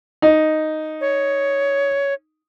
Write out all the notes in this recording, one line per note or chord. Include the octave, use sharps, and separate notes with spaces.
D#4
C#5